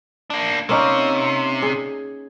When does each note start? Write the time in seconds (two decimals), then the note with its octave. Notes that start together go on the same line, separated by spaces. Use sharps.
0.30 A#3 D4
0.69 C3 A#3 C#4 D#4
1.62 G#4